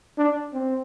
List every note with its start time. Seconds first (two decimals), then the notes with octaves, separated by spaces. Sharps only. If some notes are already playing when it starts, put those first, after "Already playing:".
0.18 D4
0.53 C4